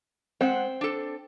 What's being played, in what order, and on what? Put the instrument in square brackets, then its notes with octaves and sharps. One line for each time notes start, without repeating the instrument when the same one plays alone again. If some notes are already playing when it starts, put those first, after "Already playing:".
[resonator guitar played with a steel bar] G#3 C5 F#5 [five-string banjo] C4
[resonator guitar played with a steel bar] D4 A4